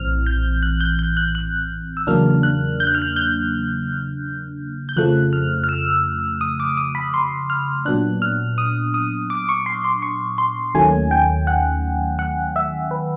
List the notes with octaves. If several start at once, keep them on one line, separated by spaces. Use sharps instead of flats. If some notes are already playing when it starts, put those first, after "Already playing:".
Already playing: A#1 A2 E3 C4 F6
G6
F#6
G6
G6
F#6
F#6
E6
E2 C#3 F#3 A#3 D4 F6
F#6
G6
F#6
F6
F#6
G6
G6
F2 C#3 F3 A3 F#6
F6
F6
E6
D#6
D6
D#6
B5
C6
F6
A#2 F#3 B3 D4 F#6
F6
D#6
D#6
D6
C#6
C6
C6
C#6
C6
D#2 D#3 F#3 A3 C#4 G#5
G5
F#5
F#5
E5
B4